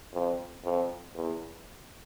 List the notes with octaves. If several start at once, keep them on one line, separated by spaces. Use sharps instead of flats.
F2
F2
E2